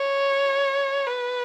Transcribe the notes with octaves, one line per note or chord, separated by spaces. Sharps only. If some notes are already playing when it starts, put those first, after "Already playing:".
Already playing: C#5
B4